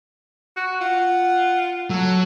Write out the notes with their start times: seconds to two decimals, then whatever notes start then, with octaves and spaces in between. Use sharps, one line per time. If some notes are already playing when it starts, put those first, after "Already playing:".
0.57 F#4
0.81 F4 F#5
1.90 F#3 A4